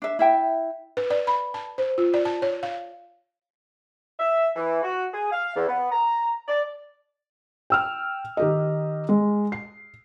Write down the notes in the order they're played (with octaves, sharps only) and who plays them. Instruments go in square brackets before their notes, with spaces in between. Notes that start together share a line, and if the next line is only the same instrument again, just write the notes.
[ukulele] D4 E5
E4 E5 G5
[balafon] B4
D5
B5
A5
C5
F4
D5
A5
C#5
F5
[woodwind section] E5
E3
F#4
G#4
F5
E2
B3
A#5
D5
[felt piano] G5 E6 F6
D#3 G4 D#5
G#3
C7